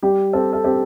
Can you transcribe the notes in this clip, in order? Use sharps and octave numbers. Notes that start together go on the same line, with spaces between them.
G3 G4
C4 A4
A4
C4 G4